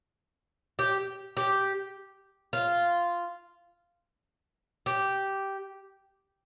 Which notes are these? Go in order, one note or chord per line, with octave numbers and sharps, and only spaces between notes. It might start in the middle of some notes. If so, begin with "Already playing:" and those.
G4
G4
F4
G4